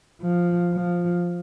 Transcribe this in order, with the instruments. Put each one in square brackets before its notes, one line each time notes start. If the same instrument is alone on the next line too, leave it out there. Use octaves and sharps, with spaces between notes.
[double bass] F3
F3